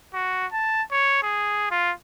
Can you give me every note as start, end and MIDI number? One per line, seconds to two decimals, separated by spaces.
0.14 0.46 66
0.52 0.82 81
0.92 1.21 73
1.22 1.67 68
1.71 1.92 65